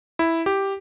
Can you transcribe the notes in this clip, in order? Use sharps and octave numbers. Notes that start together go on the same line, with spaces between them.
E4
G4